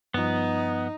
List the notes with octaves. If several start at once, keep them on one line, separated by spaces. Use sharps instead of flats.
G2 F3 B3 D#4